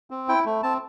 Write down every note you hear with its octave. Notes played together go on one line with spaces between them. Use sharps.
C4
E4 G5
A3
C4 A5